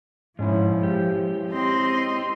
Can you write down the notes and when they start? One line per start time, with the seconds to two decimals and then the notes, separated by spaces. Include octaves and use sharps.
0.39 G#2 F3 G#3 C#4 E4
0.83 G4
1.51 C4 D#5 C6